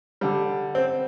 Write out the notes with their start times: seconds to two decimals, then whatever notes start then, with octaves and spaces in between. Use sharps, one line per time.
0.21 D3 G3
0.75 C4